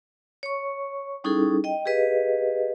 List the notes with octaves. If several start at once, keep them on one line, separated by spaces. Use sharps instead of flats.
C#5 C#6
G3 C#4 D#4 E4 G#4 A4
D#5 G5
G4 G#4 B4 D#5 F5